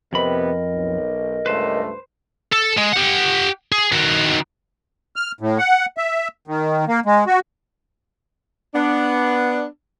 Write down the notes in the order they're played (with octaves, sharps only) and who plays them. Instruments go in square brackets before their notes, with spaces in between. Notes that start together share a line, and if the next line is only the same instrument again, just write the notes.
[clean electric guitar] F2 B5 [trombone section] C3 B3 C4 [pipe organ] A#4 D#5
[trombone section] B1
[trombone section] C#2 G2 A3 [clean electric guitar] B4 C5
[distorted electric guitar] A4
G#3
G4 F#5
G#4
D#3 F#4
[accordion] F6
A2
F#5
E5
D#3
A#3
G#3
F#4
[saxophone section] B3 D4